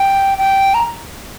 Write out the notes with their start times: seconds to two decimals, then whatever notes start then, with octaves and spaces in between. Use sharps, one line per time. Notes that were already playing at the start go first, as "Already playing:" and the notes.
Already playing: G5
0.39 G5
0.74 A#5